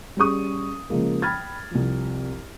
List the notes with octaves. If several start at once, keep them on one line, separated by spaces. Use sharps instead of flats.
G3 C#4 G#4 C#6 D#6
C#3 F3 G#3 A#3
G5 B5 F6 G#6 A6
C2 F3